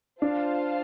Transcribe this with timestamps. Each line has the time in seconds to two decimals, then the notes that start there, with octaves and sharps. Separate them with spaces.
0.22 D4 F4 C5 F5 A5